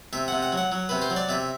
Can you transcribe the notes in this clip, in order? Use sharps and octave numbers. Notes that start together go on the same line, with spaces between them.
C3 E5
C3 F#5
F#5
F#3
F#5
F#3
C3 B4
C5
F#3
D5
C3 E5